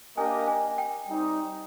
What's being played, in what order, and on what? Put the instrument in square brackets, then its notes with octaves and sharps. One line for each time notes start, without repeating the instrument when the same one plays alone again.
[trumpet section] A#3 D4 G4 A#4 D#5 [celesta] G#5
[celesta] G#5
G5
[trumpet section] G3 C4 D#4